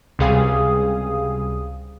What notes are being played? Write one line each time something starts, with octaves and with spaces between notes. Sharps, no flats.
C#2 C3 G3 G#4 F5 D#6